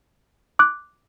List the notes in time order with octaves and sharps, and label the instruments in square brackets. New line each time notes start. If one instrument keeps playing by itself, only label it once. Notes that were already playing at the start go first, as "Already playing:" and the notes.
[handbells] D6 F#6